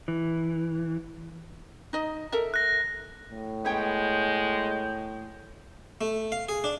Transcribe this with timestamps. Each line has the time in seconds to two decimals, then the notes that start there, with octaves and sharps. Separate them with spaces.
0.08 E3
1.93 D#4 D#5
2.32 A4 A#4 E5
2.54 F#6 A#6
3.30 A2
3.65 G#3 B3 C#5 G5 G6
6.01 A3
6.32 F5
6.49 G#4
6.64 D4